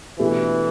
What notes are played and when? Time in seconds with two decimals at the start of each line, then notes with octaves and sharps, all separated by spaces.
0.19 B2 E3 A3 D4 G4